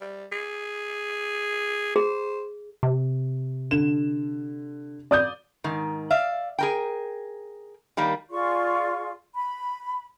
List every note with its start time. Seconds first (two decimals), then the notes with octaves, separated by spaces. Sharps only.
0.01 G3
0.32 G#4
1.96 G#4 C5
2.83 C3
3.71 D3 E7
5.11 D5 D#6 G6
5.64 G#2 D#3
6.10 D5 E5 F5
6.59 G#4 A#4 G5
7.97 D#3 G3 A#3
8.31 F4 G#4 D5 C#6
9.35 B5